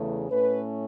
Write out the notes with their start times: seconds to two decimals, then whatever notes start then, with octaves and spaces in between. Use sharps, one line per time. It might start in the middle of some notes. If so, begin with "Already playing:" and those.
Already playing: E2 C#3 E3 A3
0.30 A2 A3 C#4 B4